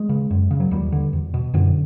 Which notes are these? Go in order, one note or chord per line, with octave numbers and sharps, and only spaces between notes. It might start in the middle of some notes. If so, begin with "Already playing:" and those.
Already playing: G#3
C#3
F#2
C#3
F#3
D#2 G3
D3
E2
B2
F#2 D3